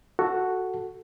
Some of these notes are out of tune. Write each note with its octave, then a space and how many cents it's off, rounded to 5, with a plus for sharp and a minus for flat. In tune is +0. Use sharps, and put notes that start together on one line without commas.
F#4 +0 A4 +0